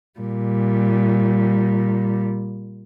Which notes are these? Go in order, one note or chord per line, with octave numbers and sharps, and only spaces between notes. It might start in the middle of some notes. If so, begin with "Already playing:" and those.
A#2 G3